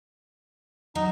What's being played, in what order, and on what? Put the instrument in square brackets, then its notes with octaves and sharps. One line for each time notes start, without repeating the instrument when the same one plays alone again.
[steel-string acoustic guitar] F#3 [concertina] D#4